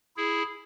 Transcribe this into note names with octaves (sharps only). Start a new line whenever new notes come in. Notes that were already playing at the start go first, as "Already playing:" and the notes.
E4 G#4